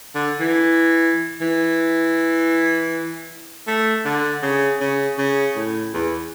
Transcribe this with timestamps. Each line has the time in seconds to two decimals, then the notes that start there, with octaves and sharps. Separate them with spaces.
0.15 D3
0.40 E3
1.41 E3
3.67 A3
4.05 D3
4.42 C#3
4.80 C#3
5.18 C#3
5.56 A2
5.94 E2